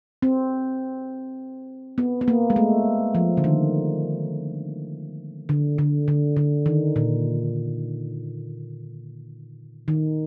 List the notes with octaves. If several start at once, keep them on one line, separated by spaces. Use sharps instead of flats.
C4
B3
B3
A#3
G#3
A3
F3
D3
D#3
D3
D3
D3
D3
D#3
A#2
D#3